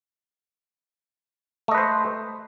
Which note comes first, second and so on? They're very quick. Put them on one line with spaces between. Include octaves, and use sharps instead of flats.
A3 D#5 B4 C5